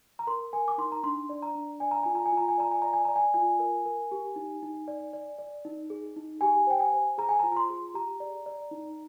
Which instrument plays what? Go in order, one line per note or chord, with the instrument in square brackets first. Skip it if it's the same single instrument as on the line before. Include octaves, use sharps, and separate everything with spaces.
[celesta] A#5
A#4 C6
A#4 G#5
D6
D#4 C6
A#5
D4 C6
D5
A#5
D4
D5 G#5
A#5
F4 G#5
A#5
G#5
F4 A#5
G#5
D5 A#5
G#5
D5 A#5
G#5
D5 A#5
G#5
F4 G#5
A#4
A#4
G4
D#4
D#4
D5
D5
D5
D#4
G#4
D#4
G4 G#5
C5 G5
G#5
C5
G#4 A#5
G#5
A#5
F4
A#5
C6
G#4
G4 A#5
D5
D5
D#4